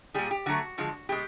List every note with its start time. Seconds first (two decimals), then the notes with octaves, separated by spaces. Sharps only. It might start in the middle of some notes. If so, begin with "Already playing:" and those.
0.14 A#2 G3 G#4
0.31 G4
0.46 D3 F#3 A3 F#4
0.78 D3 F3 G#3
1.09 B2 G#3 G4